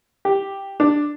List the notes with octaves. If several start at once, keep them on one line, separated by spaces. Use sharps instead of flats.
G4
D4